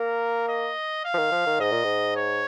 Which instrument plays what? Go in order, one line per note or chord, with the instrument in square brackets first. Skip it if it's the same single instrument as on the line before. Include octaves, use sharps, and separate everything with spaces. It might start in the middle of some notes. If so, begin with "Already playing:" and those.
Already playing: [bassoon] A#3 [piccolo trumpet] A#4
[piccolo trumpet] D#5
F5
[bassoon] F3
D#3
F3
D#3
[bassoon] G#2 [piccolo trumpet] D#5
[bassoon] A#2
G#2
[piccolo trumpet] C#5